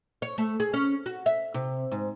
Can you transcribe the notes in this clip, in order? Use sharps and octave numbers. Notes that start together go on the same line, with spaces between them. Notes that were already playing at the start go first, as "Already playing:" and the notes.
C#5
A3
G#4
C#4
F#4
E5
C3
G#2